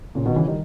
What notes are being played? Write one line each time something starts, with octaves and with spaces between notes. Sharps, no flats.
A#2 C#3
B2 D#3
C#3 E3
D#3 G3